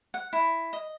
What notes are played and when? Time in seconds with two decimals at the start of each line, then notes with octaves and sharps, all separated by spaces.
0.14 F#5
0.33 E4
0.73 D#5